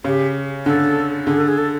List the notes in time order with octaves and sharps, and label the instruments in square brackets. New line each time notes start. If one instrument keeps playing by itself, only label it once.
[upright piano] C#3 [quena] G4
[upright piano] D3 [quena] A4
[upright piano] D3 [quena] G#4
[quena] A4
G#4
A4